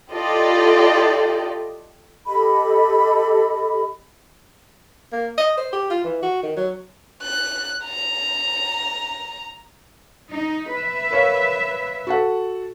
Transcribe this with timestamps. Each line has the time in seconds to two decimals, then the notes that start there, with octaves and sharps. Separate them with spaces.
0.10 E4 F4 G4 A4 D5 D#5
2.27 G4 A4 D#5 B5
5.13 A#3
5.38 D#5
5.58 C5
5.73 G4
5.91 F4
6.04 E3
6.23 F#4
6.43 D#3
6.57 F#3
7.23 F#6
7.84 A#5
10.31 D#4
10.73 B4 E5
11.11 A#4 C#5 F5
12.07 F#4 A4 F#5